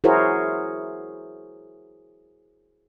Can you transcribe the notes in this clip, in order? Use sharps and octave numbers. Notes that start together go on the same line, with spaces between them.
E4 F#4 G#4 A#4 C5 C#5